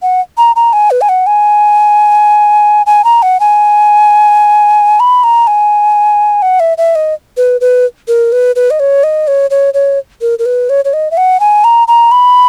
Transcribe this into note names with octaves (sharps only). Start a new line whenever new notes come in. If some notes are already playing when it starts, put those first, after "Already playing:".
F#5
A#5
A#5
G#5
B4
G#5
F#5
G#5
G#5
A#5
F#5
G#5
B5
A#5
G#5
F#5
E5
E5
D#5
B4
B4
A#4
B4
B4
D#5
C#5
D#5
C#5
C#5
C#5
A#4
A#4
B4
C#5
C#5
D#5
E5
F#5
G#5
A#5
A#5
B5